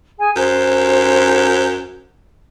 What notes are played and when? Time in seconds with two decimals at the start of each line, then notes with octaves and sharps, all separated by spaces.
0.18 G#4 G#5
0.36 F#2 C5